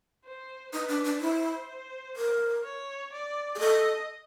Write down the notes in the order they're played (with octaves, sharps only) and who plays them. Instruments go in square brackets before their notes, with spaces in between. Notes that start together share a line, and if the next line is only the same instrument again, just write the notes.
[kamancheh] C5
[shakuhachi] D#4 [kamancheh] B4
[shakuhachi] D4
D4
[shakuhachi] E4 [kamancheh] C5
[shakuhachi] A#4
[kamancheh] C#5
D5
[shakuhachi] G#4
[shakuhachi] A4 [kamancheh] D#5